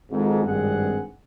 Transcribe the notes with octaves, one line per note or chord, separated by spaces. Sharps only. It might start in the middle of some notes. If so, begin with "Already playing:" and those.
G#1 F2 G#2
G#1 G2 C4 G#4 F#5